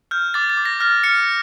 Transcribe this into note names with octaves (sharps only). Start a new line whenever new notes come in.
F6 G6
D6 A6
A6
D6
A#6
F6 A#6
F6 C#7